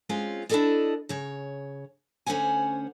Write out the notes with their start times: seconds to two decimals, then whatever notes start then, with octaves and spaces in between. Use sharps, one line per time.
0.09 G#3 C4 C#4 F4
0.49 D4 E4 F#4 A4 D5 D#5
1.09 C#3 C#5
2.26 D2 C#4 C5 C#5 F#5 G#5